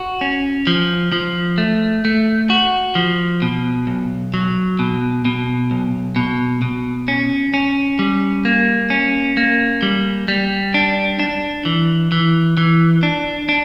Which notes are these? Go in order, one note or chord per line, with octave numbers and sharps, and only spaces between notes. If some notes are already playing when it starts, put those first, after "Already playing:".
Already playing: F#4
C#4
F3
F3
A3
A3
F#4
F3
B2
B1
F#3
B2
B2
B1
B2
B2
C#4
C#4
G3
A#3
C#4
A#3
G3
G3
D4
D4
E3
E3
E3
D4
D4